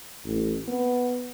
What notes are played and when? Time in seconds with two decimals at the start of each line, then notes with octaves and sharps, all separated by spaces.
0.25 A1
0.68 B3